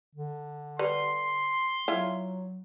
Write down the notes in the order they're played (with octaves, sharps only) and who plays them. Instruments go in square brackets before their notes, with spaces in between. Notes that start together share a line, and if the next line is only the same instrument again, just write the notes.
[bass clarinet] D3
[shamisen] G3 B4 [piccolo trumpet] C6
[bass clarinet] F#3 [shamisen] E4 F4